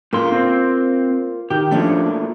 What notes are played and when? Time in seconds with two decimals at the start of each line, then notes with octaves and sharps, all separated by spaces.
0.13 A#2 C#3 A#3 F4 C6
0.32 C4 C5
1.50 D#3 G4
1.71 A#2 F3 A3 C#4 D4